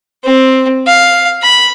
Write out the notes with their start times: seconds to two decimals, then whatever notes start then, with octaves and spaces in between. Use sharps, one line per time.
0.24 C4
0.87 F5
1.43 B5